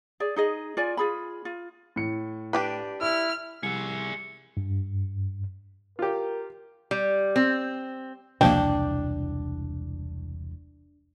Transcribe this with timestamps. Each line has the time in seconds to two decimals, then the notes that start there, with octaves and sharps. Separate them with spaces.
0.20 G#4 D5
0.36 D#4 G#4 D#5
0.77 F4 D5 G#5
0.97 F4 G#4 B5
1.45 F4
1.96 A2 C#7
2.53 D4 G4 B4
3.01 E4 E6 F6
3.63 C2 G#4 E5 C#7
4.57 G2
5.99 F4 G4 A#4
6.91 G3
7.36 C4
8.41 E1 C2 B2 F3 A#3 D4 G5